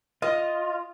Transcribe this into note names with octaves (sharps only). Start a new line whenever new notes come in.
F4 D#5